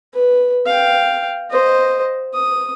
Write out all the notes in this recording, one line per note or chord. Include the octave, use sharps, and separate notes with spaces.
B4
F5 G5
C5 D#5
D#6